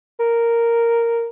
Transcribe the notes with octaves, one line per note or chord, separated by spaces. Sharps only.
A#4